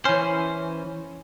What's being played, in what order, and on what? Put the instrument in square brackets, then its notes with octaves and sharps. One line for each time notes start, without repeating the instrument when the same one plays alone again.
[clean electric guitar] E3 C5 [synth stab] C#4